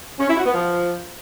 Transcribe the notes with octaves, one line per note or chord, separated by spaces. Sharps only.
C#4
E4
F#4
B3
F3